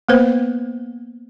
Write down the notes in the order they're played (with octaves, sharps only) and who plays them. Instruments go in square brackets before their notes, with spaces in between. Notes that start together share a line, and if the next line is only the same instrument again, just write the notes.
[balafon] A#3 B3 B4 C5